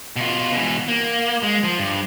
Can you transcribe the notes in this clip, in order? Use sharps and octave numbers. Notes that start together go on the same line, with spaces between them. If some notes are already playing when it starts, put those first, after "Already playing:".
B2 F4
B2 E3
A#3
G#3
F3
G2